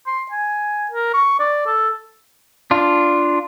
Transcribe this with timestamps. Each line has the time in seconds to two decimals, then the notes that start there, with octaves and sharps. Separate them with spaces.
0.07 C6
0.32 G#5
0.91 A#4
1.14 C#6
1.40 D5
1.67 A4
2.71 D4 F4